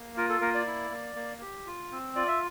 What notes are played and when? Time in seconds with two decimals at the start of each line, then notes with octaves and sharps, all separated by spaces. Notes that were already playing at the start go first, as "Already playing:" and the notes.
Already playing: A#3
0.17 F4 A#4
0.29 A4
0.41 A#3 A#4
0.54 D5
0.67 E4
0.91 A#3
1.16 A#3
1.42 G4
1.67 F4
1.92 C4
2.16 F4 D5
2.28 E5